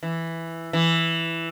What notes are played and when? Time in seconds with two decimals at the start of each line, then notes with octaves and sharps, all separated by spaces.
0.03 E3
0.73 E3